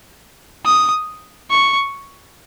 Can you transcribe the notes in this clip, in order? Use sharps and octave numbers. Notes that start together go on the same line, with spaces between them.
D#6
C#6